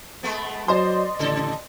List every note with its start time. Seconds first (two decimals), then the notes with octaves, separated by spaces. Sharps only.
0.23 G#3 A3 B3
0.68 F#3 C5 D5 D#5 C6
1.19 A1 C#3 A4